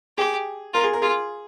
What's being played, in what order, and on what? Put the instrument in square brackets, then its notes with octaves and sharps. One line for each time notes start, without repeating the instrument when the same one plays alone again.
[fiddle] G4 [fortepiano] G#4
[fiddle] F4 [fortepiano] A#4
[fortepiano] G#4
A#4
[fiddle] F4 [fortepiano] G#4